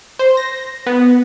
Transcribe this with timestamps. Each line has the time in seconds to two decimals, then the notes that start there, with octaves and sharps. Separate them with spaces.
0.19 C5
0.37 A#6
0.87 B3